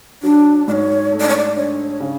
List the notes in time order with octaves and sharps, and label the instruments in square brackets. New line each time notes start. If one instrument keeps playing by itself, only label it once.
[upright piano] F#3 [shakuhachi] D4
[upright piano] G#2 [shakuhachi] D5
[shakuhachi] C#5
[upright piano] A3
[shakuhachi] D5
C#5
D5
[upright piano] D4 [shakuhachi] C#5
[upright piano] C#3